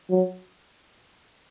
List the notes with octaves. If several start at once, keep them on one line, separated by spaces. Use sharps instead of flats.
F#3